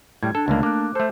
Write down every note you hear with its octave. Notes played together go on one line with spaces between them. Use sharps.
A2 G3 G#6
D4 A4
C#2 D3 A3 A#3
A#3 D6 F#6
A3 A4 C5